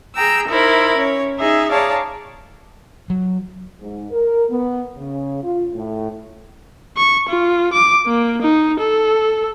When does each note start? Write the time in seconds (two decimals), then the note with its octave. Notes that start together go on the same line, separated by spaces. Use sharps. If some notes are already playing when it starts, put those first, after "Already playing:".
0.16 G#4 G5 A#5 E6
0.48 D#4 E4 A#4 C5 B5
0.96 C#4 C#5
1.38 D#4 G#4 E5
1.71 G#4 C#5 D5 F5 A5 A#5
3.10 F#3
3.80 G#2
4.10 A#4
4.50 B3
4.96 C#3
5.43 F4
5.73 A2
6.97 C#6
7.29 F4
7.73 D6
8.07 A#3
8.42 D#4
8.80 A4